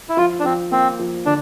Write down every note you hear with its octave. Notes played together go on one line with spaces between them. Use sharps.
E4
F3 F4
D4
F3 C4
A#3 C4
F3
D3 D4